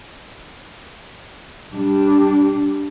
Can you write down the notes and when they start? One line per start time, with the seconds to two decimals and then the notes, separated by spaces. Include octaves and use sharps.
1.74 G3 D4